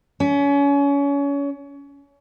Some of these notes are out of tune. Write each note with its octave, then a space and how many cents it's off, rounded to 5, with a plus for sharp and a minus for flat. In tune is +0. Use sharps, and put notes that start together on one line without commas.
C#4 +30